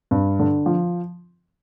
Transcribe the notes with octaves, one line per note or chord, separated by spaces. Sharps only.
G2
D3
F3